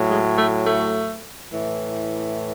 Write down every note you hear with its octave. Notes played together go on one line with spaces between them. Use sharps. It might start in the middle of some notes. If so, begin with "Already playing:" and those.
Already playing: A2 F#3
G#3
A3
A3
A2 E3